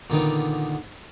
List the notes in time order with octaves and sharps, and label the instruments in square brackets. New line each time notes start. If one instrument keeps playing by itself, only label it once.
[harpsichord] A#2 D3 D#3 B3